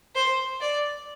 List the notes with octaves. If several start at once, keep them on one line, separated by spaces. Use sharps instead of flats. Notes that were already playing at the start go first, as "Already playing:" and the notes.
C5
D5